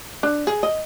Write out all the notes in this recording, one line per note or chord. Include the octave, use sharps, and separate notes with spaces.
D4
G#4
D#5